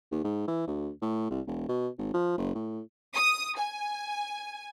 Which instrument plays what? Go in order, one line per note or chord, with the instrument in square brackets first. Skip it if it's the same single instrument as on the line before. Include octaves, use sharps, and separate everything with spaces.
[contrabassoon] D#2
G#2
E3
D2
A2
C2
E1
B2
G#1
F3
F#1
A2
[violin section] D#6
G#5